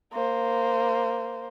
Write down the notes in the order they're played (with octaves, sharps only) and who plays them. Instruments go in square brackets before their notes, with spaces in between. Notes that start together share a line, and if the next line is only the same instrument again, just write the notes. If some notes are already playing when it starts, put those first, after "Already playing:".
[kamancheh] A#3 C5